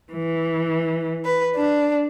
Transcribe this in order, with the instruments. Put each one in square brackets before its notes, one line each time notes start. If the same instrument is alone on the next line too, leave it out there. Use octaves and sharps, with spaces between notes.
[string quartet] E3
B4
D4